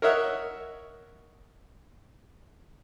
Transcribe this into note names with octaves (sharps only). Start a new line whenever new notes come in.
A#4 C#5 D#5 E5 F#5